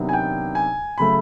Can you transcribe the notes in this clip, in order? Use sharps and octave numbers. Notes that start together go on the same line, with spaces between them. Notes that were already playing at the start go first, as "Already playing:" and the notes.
Already playing: C3 D#3 F#3 B3 D4
G#5
G5
G#5
C#3 F#3 A3 B5